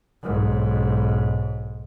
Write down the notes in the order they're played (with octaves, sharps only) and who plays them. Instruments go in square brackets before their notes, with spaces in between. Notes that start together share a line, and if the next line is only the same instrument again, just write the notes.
[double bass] B1 G#2